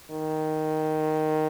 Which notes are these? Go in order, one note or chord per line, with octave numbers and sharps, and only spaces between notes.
D#3